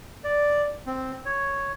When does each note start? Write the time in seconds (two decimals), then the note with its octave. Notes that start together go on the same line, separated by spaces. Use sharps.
0.24 D5
0.86 C4
1.25 C#5